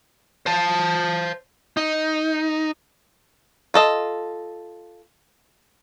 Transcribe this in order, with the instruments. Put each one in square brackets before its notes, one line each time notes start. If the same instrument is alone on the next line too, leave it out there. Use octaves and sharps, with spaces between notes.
[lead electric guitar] C5 A5
D#4
[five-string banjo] F4 A4 D#5